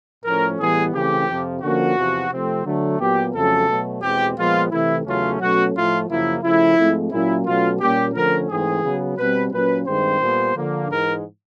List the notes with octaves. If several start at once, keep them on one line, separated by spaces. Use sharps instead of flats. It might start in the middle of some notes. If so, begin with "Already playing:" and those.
A2 F3 A3 C#4 A#4
A2 E3 G3 B3 G#4
C#3 E3 A3 C4 G4
F2 C3 F3
D3 F3 A#3 C#4 F#4
E2 C3 F3
C3 F3 A3 C4
D3 F#3 A3
A#2 F#3 B3 G4
F2 C#3 F#3 A3 C#4 A4
B2 F#3 A3
E2 B2 G#3 C4 G4
A#2 F3 G#3 B3 F4
C3 E3 A3 E4
E2 C#3 F#3 A3 C#4 F4
B2 F#3 A3 C#4 F#4
A2 F3 A3 F4
F#2 C#3 F3 A#3 E4
C#3 F3 A3 E4
G#2 F3 A3 C4
A#2 F#3 A#3 C#4 E4
B2 F#3 A3 C#4 F4
A#2 G3 A#3 C#4 G4
D3 F3 A3 C#4 A#4
G#2 E3 A3 C4 G#4
C#3 F#3 B3
B2 G3 C4 B4
A#2 F#3 A#3 C#4 B4
G2 D#3 G#3 C4 C5
A#2 G3 B3
D3 F3 A#3
G#2 E3 G#3 A#4